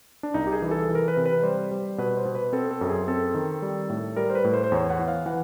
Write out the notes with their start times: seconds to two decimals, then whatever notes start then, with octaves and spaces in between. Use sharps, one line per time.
0.23 D4
0.34 C2 D#4
0.47 G4
0.53 G#4
0.62 E3
0.71 A4
0.89 E3
0.95 A#4
1.08 B4
1.17 C3
1.26 B4
1.43 G3 C5
1.71 G3
1.98 B2 B4
2.17 C5
2.25 B2
2.35 B4
2.53 C4 A4
2.71 A4
2.81 F#2
2.89 G#4
3.07 C4 A4
3.34 D#3
3.62 G3
3.90 A2
4.16 G3 A#4
4.30 C5
4.35 B4
4.44 A2
4.54 C5
4.64 C5
4.72 E2 C#5
4.90 F#5
4.99 E3
5.08 F5
5.26 E3 F#5